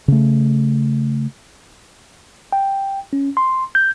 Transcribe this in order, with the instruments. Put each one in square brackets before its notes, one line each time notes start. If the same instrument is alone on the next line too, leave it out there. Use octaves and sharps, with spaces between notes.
[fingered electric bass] C#3 A3
[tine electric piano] G5
C#4
C6
G6